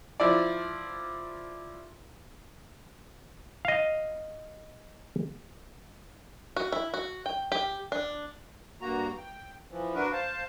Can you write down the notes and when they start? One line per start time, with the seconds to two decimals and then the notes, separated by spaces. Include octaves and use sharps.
0.20 F3 E4 D5
3.65 D#5 F5
6.56 F#4
6.72 E4
6.94 F#4
7.26 G5
7.52 G4
7.92 D4
8.81 G2 A#3 F#4 A#5
9.18 G5
9.70 E3 F3
9.95 D4 F#4 A#4 B4
10.12 C5 F5 A5